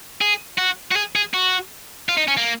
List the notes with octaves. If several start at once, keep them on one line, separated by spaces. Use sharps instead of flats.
G#4
F#4
F#4
G#4
G#4
F#4
F4
D#4
C#4
A#3